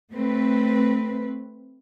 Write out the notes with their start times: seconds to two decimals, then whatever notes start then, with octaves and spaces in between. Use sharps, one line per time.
0.13 A3 C4 B4